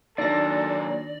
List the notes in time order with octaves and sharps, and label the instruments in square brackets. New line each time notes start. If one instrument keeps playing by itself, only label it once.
[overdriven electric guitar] A#2 F#3 [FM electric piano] D#3 D4 A#6 [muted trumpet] A4 [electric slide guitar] D5